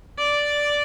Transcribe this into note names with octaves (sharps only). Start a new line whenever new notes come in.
D5